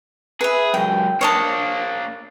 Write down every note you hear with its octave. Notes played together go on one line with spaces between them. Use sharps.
G#4 B4 E5
C#2 F#2 G5
A#3 D4 C#5 D#5 A5